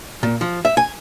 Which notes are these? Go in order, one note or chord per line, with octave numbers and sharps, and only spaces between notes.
A#2
F3
E5
G#5